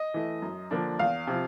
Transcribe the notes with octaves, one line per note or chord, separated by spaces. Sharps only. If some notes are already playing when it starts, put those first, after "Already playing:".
Already playing: D#5
E3 A3
F#2
D3 F3 A#3 D4
E2 F5
C3 F3